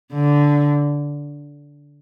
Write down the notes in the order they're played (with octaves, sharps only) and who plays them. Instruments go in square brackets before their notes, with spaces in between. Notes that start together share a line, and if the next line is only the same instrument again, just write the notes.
[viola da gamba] D3